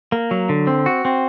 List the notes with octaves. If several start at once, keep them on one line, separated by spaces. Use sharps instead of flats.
A#3
F#3
D3
C4
F#4
C4